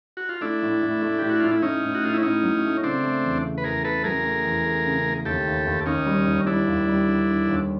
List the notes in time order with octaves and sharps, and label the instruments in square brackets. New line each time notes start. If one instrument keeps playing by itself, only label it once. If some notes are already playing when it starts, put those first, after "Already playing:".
[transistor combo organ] F#4
F4
[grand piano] A3 [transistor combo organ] D4 E4
[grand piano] A2
A2
A3
[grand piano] A2 [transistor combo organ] G4
[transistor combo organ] F#4
[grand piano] A2 [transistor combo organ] F4
[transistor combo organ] E4
[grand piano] A2 [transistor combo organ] C#4 D#4
[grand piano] A2
[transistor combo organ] F#4
[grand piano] A2 [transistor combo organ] F4
[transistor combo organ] E4
[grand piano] A2 [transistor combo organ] C#4 D#4
[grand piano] F#3
A3
[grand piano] C#3 [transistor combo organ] C4 D4
[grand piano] A3
E2
C#3
[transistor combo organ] B4
[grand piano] E2 [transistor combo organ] G#4 A#4
[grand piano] C#3 [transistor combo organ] A4 B4
[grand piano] F#3 [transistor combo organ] G#4 A#4
[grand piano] A3
E2
A3
C#3
A3
[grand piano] D#2 [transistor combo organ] G4 A4
[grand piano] D#2
D#2
[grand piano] D#2 [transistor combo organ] C#4 D#4
[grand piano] G3
D#2
[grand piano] G3 [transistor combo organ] D4 E4
[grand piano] D#2
G3
D3
D3
D#2